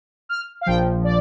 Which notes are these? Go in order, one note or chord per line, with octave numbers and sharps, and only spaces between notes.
F6
F5
A#1 A#2 F3 G5
D5